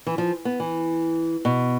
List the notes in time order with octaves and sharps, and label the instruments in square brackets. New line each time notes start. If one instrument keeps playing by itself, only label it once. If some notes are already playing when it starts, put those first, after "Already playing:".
[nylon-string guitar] E3
F3
B3
E3
B2